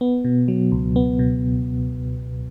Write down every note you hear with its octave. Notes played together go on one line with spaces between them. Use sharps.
B3
B2
F#3
C#2
B3
B2